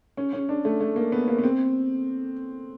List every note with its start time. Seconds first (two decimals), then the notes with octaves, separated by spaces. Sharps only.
0.17 C#4
0.33 C#4
0.49 D4
0.65 A3
0.81 A3
0.96 A#3
1.12 B3
1.28 A#3
1.39 B3
1.44 C4